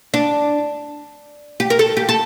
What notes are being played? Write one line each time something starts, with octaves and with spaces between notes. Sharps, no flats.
D4
G4
A#4
A4
G4
A4